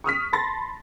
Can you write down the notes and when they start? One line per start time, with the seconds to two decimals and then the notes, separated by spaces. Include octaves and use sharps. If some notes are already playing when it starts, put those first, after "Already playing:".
0.04 C#6 D#6 F6 B6
0.33 A5 B5 C6 A6 A#6